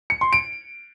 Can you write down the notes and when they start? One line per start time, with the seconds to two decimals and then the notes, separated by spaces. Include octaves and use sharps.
0.10 C#7
0.21 C6
0.33 D7